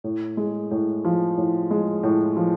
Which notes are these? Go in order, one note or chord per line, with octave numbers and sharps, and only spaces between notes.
A2
G#3
A2
F3
A2
G#3
A2
F3